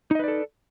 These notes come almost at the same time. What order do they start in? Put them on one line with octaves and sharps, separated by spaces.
D#4 D#5 B4 D5 A4